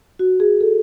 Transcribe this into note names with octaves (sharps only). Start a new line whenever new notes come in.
F#4
G#4
A4